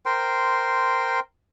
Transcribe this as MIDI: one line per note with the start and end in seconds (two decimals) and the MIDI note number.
0.06 1.20 70
0.06 1.20 72
0.06 1.20 79
0.06 1.20 84